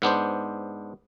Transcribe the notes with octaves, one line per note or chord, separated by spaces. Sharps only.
G#2 B3 D4 C5